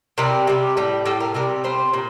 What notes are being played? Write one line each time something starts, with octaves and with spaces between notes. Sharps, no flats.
C3 G3 A#4
C3 G3
A2 G3
A2 G3 A4
A#4
C3 G3 A#4
C3 G3 C5
A#2